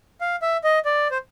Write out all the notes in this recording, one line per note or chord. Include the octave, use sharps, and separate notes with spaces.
F5
E5
D#5
D5
C5